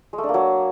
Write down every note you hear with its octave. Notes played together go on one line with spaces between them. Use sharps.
G#3
A3
D4
A#3
F#3